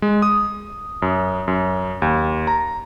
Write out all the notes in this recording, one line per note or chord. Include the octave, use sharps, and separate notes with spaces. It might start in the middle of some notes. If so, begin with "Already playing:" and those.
G#3
D#6
F#2
F#2
D#2
A#5